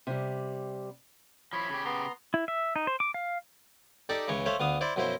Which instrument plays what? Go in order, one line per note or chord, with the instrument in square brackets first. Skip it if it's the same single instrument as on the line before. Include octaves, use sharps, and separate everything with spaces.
[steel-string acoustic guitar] C3 G3
[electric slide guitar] F3 E4 [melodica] C#5 B5
[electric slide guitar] C#3 G4
[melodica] B3 A#5 C6
[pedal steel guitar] E4
E5
D#4
C5
D6
F5
[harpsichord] D#4 G4 A4 D5
C#2 C#3 E3 C#5 C#6
A3 C5 C#5 E5 F5
D2 B3 F5 D#6
E4 C5 D5
F#2 B2 F3 E4 C5